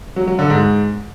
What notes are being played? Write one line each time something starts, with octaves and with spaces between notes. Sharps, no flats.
F#3
F#3
D3
G#2